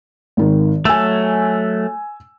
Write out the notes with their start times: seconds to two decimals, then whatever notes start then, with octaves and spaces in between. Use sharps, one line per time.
0.37 G#1 D#3
0.85 F#3 A3 G#5 E6